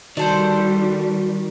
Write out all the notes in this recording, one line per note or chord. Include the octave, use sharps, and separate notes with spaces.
D#3 G3 D4 F#4 A4 C5